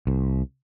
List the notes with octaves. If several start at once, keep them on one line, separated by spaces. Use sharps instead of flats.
C2